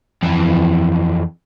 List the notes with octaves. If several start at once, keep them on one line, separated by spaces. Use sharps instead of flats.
F2 E3